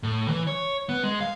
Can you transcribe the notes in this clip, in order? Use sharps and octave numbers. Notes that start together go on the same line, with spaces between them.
A2
E3
C#5
B3
G#3
F5